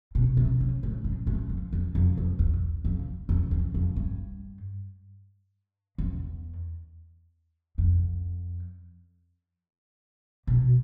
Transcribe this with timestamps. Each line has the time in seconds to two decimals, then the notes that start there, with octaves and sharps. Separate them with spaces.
0.15 B2
0.37 C3
0.61 C#3
0.83 A2
1.04 G#2
1.27 A2
1.49 F2
1.73 E2
1.95 F2
2.17 F2
2.39 E2
2.85 F2
3.29 E2
3.51 E2
3.74 F2
3.96 G2
5.98 E2
7.78 F2
10.47 B2